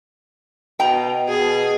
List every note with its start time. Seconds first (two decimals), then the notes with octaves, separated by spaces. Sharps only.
0.80 B2 G5 A#5
1.29 B2 G#4